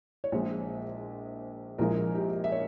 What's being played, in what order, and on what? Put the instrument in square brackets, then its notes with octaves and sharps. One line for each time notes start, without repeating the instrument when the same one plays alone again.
[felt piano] C#5
A#1 A#2 G#3 C5
A#1 A#2 F3 G#3 A#4
G4
E5
C#5